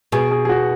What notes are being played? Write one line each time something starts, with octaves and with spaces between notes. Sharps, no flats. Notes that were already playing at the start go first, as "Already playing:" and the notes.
B2 G#4
G#4
G#4
F#4